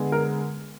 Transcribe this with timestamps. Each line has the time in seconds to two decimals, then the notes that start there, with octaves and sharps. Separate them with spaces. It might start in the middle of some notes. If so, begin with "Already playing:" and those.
Already playing: D3 G#3 B3
0.12 A#4